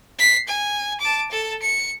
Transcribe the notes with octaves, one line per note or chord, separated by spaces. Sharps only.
B6 C7
G#5
A5 D6
A4 A5
C#7